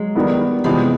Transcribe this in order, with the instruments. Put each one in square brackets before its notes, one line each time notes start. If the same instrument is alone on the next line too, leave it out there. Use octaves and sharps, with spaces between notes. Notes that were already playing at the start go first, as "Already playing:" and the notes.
Already playing: [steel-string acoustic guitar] F#3 G#3
[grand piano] D#3 G3 B3 E4
[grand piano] C3 E3 G#3 B3 [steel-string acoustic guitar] F3 G3